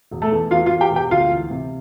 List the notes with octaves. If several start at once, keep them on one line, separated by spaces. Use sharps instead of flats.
E1
A3 A4
E2
E2 F4 F5
F4 F5
E2
G4 G5
E1
G4 G5
D2 F4 F5
E3
C3